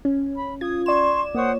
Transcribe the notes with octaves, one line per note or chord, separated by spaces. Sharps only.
C#4
B5
F4 D#6 G#6
D5 C6 C#6 E7
A#3 C5 C#5 F#5 D#6